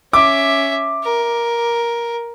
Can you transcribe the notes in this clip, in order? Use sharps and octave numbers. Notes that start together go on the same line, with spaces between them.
C#4 E5 D6
A#4